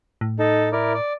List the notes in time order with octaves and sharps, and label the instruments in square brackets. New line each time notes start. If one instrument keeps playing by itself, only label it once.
[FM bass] A2
[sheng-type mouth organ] D#4 A4
E4 A#4 D5
D5